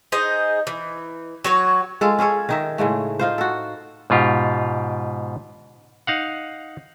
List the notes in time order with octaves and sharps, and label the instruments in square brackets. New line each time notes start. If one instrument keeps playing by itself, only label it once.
[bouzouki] D#4 G#4 C5 D#5
E3
F#3 F#4 C#5
[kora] G#3 F4 A4
C#4 G#4 A4 C#5
D#3 D#4 E5
A2 C#3 G#3 A3
D#4 F4 C5
F#4 A4
[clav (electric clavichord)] G#2 B2 F4 G4
D#4 F5 F#5